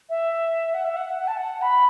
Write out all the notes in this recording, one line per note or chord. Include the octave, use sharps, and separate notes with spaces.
E5
F#5
E5
F#5
F#5
A5
F#5
B5